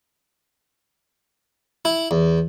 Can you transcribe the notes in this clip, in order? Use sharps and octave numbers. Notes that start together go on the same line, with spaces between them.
E4
E2